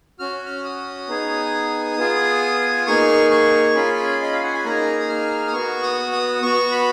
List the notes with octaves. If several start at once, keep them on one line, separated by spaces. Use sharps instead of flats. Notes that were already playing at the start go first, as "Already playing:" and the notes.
C#4 F#4 F6
F6
D#6
B3 D#4 G#4
B3 F4 G#4
A#3 D#4 G#4 C#6
C#6
C#4 F4 G#4 B5
D#5
F5
F#5
G#5
A#3 D#4 G#4 A#5
D#6
F6
D#6
B3 F#4 C#6
D#6
D#6
B3 F#4 C#6
B5